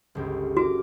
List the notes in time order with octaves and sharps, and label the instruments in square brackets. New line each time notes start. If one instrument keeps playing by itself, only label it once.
[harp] G1 C#2 G4
[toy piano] F#4 [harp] A#4 D6